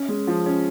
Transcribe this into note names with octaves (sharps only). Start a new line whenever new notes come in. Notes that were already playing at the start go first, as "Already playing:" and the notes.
Already playing: C#4
G#3
F3
C#4